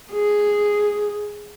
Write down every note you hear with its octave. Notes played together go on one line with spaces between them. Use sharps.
G#4